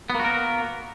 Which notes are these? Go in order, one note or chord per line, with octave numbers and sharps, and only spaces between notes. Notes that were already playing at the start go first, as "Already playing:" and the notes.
A#3 B3 F#4 A#4